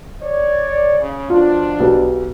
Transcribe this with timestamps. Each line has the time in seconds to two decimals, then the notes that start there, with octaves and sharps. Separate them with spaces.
0.22 C#5 D5
1.00 C#3
1.30 B2 F3 D4 F4
1.80 B1 B3 G4